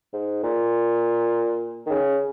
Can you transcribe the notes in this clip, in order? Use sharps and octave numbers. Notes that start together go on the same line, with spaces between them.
G#2
A#2
D#3
C#3